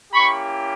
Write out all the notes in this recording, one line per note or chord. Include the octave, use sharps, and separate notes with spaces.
A#3 C#4 E4 G4 B5 C#6